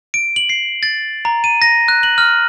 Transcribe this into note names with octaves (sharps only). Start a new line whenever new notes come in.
D7
F#7
C7
A6
A#5
D#7
A#6
F#6
F#7
F6